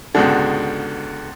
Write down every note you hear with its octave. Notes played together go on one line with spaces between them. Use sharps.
C#2 G#2 B2 D3